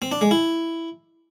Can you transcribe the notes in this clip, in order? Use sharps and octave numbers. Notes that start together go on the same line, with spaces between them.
C4
D4
G#3
E4